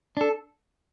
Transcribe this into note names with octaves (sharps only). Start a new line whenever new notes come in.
D4 A4